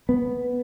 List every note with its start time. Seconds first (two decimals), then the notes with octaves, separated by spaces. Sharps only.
0.09 B3